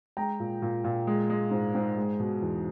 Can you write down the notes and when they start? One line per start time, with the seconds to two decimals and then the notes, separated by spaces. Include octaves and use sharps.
0.17 G#3 G5 A#5
0.40 A#2
0.62 A#2
0.84 A#2
1.07 G#3
1.30 G#3
1.51 G#2
1.75 G#2
1.97 G#3
2.20 B2
2.42 E2